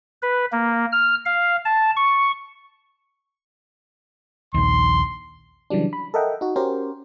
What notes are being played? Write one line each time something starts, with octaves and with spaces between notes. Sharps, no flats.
B4
A#3
F6
F5
A5
C#6
A#1 D#2 C6
C#3 E3 F#3 G3 D4
B5
A4 A#4 D#5 E5 F#5 G5
D#4 F#4
C#4 F#4 G4 A#4 C5